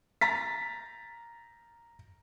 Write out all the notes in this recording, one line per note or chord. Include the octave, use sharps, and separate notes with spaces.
A#5 A6 B6